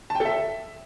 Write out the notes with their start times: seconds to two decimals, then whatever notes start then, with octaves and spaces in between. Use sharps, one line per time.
0.10 A5
0.15 G5
0.20 A4
0.25 E5